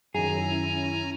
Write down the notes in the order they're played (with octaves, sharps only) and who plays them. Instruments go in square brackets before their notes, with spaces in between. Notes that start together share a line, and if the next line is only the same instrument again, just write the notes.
[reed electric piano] F#2 D#3 [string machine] C#4 E4 [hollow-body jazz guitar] G#4 [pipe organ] G#5 A#5